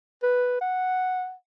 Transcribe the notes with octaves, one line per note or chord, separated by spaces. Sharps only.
B4
F#5